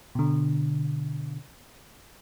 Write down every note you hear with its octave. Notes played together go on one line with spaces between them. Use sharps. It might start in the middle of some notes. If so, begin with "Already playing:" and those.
B2 D3